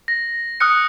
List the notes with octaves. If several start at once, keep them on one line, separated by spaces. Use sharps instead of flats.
A#6
D#6 F6 F#6 C#7